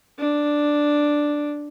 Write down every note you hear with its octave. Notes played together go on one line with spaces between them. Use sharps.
D4